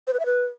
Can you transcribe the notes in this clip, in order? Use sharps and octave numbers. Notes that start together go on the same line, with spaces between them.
C5
B4
E5
B4